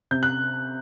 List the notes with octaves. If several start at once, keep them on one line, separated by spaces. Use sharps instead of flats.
C3 G6
F#6